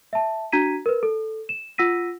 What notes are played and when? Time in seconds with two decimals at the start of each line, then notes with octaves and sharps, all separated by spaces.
0.13 E5 A5
0.52 D4 F#4 A#5 G#6 B6 D#7
0.86 A#4 B4
1.03 A4
1.49 E7
1.78 F4 F#5 E6 A#6 B6 D#7